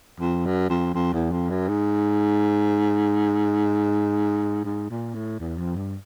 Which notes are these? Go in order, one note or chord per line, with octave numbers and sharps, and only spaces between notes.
F2
F#2
F2
F2
E2
F2
F#2
G#2
G#2
A#2
A2
E2
F2
G2